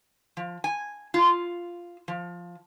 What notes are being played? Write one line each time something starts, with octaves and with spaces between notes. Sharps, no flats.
F3
G#5
F4
F3